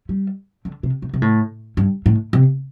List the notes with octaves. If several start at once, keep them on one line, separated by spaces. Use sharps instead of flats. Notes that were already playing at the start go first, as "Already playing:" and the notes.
G3
D3
C3
C3
C3
A2
G2
A2
C3